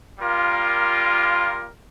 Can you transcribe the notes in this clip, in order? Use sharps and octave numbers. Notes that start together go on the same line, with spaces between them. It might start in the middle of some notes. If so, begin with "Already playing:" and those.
G3 A#3 F4 A#4